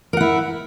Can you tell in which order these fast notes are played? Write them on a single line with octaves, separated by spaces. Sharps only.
A#4 F#5 E4